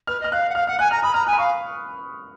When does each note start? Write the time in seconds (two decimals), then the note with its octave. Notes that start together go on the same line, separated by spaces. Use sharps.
0.07 B4 F6
0.20 D#5 F6
0.32 F5 F#6
0.49 F#5
0.55 F5 F6
0.67 F#5 F6
0.79 G#5 F#6
0.91 A#5 F6
1.03 B5 D#6
1.14 A#5 F6
1.27 G#5 F#6
1.33 B5
1.38 F5 C#6